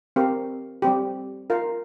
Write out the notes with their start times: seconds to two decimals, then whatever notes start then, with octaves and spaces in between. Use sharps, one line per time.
0.16 C4 G4 A#4 F5
0.82 G3 C4 G4
1.50 F4 A#4 F5